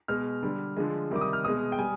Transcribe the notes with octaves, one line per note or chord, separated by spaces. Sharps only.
B2 G#3 F6
D3 G3
D3 F3 G#3
C3 D#3 G3 D6
D#6
F6
B2 G#3 D#6
G5
G3 G#5